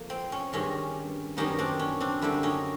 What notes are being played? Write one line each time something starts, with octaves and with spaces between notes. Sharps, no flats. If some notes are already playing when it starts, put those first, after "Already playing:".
Already playing: F2 A#3
C4
C#4
G2 D#3 G#3 C4 C#4
F#2 D#3 G3 B3 C#4 D#4
C4 D4
C#4
C4 D4
F#2 D3 G3 C4 D4 E4
C#4 D#4